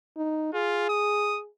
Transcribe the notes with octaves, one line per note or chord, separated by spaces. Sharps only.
D#4
F4 G#4
D#6